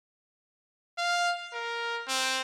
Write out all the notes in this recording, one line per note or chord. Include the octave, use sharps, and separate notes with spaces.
F5
A#4
C4